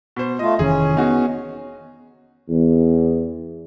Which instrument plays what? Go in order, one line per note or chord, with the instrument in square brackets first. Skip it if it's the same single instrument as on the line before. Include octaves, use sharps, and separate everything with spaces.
[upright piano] B2 C5
[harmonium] A3 F4 [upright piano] D#5
[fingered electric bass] F1 D#3 E3 [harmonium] C#4 [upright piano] G#4
[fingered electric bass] B3 [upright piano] D#4 F#4 G#4
[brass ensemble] E2